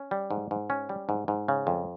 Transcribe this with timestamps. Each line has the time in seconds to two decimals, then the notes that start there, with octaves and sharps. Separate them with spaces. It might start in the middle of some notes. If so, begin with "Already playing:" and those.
Already playing: C#4
0.11 G3
0.31 G#2
0.51 G#2
0.70 C#4
0.89 G3
1.09 G#2
1.28 G#2
1.48 C#3
1.67 F2